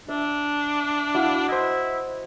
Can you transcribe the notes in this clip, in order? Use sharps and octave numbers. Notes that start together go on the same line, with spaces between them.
D4 E5
E4 F#4 F5
E4 C5 D#5